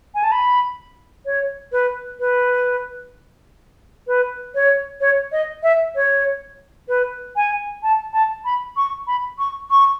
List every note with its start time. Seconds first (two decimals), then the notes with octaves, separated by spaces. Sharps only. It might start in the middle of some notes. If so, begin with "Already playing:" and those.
0.15 G#5
0.24 A5
0.32 B5
1.26 C#5
1.72 B4
2.20 B4
4.07 B4
4.55 C#5
5.00 C#5
5.32 D#5
5.63 E5
5.95 C#5
6.88 B4
7.36 G#5
7.83 A5
8.13 A5
8.45 B5
8.77 C#6
9.07 B5
9.39 C#6
9.70 C#6